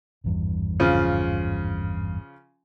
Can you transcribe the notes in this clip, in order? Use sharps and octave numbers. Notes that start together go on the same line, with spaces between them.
G#1 E2 G2
C#3 F3 F4